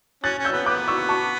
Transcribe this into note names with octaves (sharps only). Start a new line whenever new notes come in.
C#4 F#6 A6
C#4
E6 G6
B3
B3 D6 F#6
C#6 E6
A5 C#6